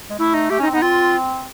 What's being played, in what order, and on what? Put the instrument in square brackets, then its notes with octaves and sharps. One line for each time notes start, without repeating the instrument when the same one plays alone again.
[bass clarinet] G#3
[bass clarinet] A3 [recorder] E4
[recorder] D#4
[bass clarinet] A3 [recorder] G4
[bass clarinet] C#4 [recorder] D#4
[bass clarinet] C4
[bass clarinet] B3 [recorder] D#4
[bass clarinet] C4 [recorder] F4